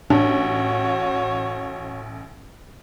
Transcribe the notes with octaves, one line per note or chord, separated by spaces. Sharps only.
A1 D4 F#4 C#5